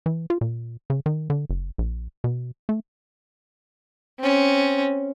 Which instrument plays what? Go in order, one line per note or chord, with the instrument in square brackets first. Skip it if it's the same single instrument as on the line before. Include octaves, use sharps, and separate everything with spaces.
[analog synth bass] E3
F4
A#2
C#3
D#3
D3
F#1
A#1
B2
A3
[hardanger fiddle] C4 C#4